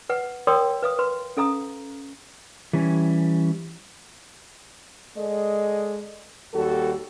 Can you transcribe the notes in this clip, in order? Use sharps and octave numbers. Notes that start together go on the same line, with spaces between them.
B4 F#5
A#4 C#5 D5 G5 C6 D#6
B4 F5 D#6
B4 C6
C#4 A4 F5 A#5 D#6
E3 G3 C#4
G#3 A4 D5 D#5
D#2 G3 F#4 A4